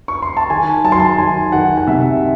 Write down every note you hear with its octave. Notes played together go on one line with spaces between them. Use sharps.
C#6
C6
A5
D#3 G#5
F#3 A5
C6
A5
D#3 G#5
D#3 F#5
F#5
C3 E5